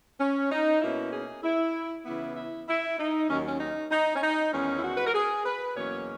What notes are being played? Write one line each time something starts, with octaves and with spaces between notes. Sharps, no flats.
C#4
D#4
B2 A#3 C#4 E4
G#4
E4
C#3 E3 B3 E4
E4
E4
D#4
D#2 D#3 F#3 C#4
C#4
D#4
D#4
C#4
D#4
E2 D#3 G#3 C#4
E4
F#4
B4
A#4
G#4
B4
E2 B2 F#3 A#3 C#4 C#5